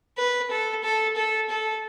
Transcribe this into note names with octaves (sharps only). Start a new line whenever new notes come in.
B4
A4
A4
A4
A4